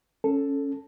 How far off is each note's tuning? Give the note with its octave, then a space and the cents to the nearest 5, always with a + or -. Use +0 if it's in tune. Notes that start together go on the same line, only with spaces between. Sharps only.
C#4 +0 A4 +0